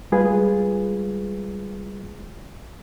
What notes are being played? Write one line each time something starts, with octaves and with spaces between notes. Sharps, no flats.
G3 G#3 F4 G#4 B4